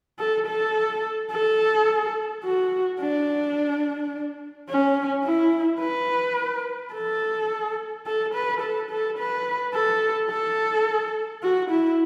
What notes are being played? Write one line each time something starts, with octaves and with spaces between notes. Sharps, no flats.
A4
A4
A4
F#4
D4
C#4
E4
B4
A4
A4
B4
A4
A4
B4
A4
A4
F#4
E4